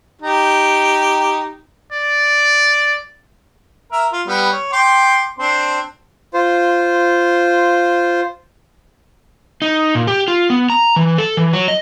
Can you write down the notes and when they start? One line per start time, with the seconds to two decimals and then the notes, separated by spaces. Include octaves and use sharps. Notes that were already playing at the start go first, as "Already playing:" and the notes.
0.22 D#4 G4
1.93 D5
3.92 A#4 E5
4.13 F4
4.27 G3 B3
4.52 C#5
4.73 G5 C6 D6
5.39 C4 D4 C6
6.34 F4 C5
9.62 D#4
9.95 A#2
10.07 G4
10.28 F4
10.50 B3
10.70 A#5
10.96 E3
11.18 A4
11.37 E3
11.53 F#3
11.68 D#5